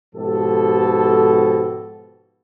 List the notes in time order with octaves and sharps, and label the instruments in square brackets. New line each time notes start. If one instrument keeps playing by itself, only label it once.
[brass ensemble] G#2 B2 F3 G4 A4